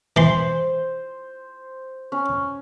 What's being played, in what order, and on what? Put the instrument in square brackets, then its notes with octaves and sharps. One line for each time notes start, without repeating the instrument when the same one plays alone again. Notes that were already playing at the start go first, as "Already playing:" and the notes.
[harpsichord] E3 C6 [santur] C5
[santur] C#4